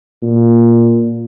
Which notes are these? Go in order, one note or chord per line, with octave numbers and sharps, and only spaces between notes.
A#2